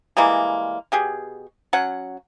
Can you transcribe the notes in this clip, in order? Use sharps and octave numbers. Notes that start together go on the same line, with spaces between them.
E3 G3 G#3 A#3
B2 G4 G#4
F#3 C#4 F#5